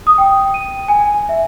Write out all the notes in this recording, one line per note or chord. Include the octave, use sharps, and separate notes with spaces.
D#6
G5
D#7
G#5
E5